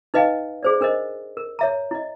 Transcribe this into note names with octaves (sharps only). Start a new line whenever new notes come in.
D#4 B4 D#5 F5 G5
G#4 C5 D5
D4 A#4 C5 D#5
A#4
C#5 E5 A#5
E4 D#5